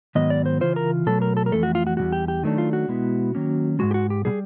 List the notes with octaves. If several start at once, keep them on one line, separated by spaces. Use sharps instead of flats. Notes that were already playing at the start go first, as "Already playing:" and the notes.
G#2 D#3 F#3 B3 D#5
D5
C5
C#3 E3 F4 C5
A#4
B2 F#3 A3 A4
A#4
A4
A#4
F2 C3 E3 A3 A4
F#4
F4
F#4
E2 B2 G3 F#4
G4
G4
D#3 F#3 A3 D4
F4
F#4
B2 G#3 B3 E4
D#3 F#3 A#3 C#4
G#2 D#3 G#3 F#4
G4
F#4
G4
B2 G3 G#4